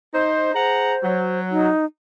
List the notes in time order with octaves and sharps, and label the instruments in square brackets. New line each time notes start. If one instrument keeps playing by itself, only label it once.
[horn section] D#4 C5
[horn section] G#4 F#5 A#5 [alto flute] C5
[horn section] F#3
[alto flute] D#4